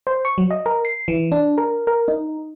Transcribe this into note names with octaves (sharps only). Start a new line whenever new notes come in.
C5
C#6
F#3
D#5
A#4
C7
E3
D4
A#4
A#4
D#4